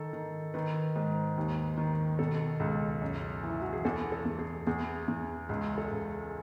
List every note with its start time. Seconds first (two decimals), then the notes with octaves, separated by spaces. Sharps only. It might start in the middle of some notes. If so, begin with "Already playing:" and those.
Already playing: D#3 A4
0.13 D#3
0.54 D#3 B4
0.96 G#2
1.37 D#2
1.77 D#3
2.19 B2 A4
2.60 C#2
3.02 F#2
3.43 E3
3.50 E4
3.61 F#4
3.73 G#4
3.85 E2 A4
4.12 A4
4.25 E2
4.39 G#4
4.67 E2 G#4
5.08 E2
5.49 C#2 G#4
5.78 A4
5.91 C#2